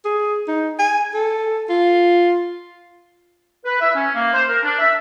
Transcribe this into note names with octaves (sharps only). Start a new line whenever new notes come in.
G#4
D#4
G#5
A4
F4
B4
E5
C#4
A#3
C5
A#4
D4
E5